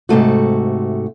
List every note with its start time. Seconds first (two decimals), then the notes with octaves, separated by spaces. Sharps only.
0.09 G#2 C3 A3 F#4